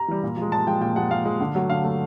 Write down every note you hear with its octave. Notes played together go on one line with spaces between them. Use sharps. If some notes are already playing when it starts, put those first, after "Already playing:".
Already playing: A#5
E3 G3
A#2
F3 G#3
A#2 A5
F3 G#3 G5
A#2 G5
F3 G#3 F#5
A#2 F5
F3 G#3
D3
F#3 A3
D3 F5
F#3 A3